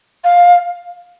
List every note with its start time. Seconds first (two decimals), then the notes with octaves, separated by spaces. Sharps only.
0.24 F5